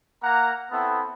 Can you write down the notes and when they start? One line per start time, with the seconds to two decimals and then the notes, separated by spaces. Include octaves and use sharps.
0.24 A#3 F#5 A#5
0.71 B3 C4 E4 A4